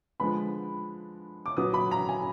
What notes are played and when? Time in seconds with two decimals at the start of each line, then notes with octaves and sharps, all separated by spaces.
0.20 D3 F3 G#3 B3 B5
1.46 D6
1.57 A#2 F#3 B3 D#6
1.74 B5
1.91 A#5
2.09 G#5